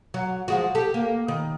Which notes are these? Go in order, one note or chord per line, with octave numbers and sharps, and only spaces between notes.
F#3
F3 G#3 F#4
G4 A4
A#3
D#3